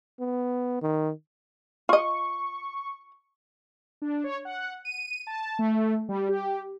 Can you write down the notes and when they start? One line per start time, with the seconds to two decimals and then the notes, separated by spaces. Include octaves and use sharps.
0.20 B3
0.82 D#3
1.89 F4 D#5 C#6
4.02 D4
4.24 C#5
4.45 F#5
4.85 D#7
5.27 A5
5.59 A3
6.09 G3
6.29 G4